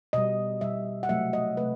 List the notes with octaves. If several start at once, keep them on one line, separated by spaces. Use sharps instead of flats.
B2 G3 D#5
B2 G3 E5
F#5
C3 F#3 A3 E5
D#5
C3 F#3 A3 B4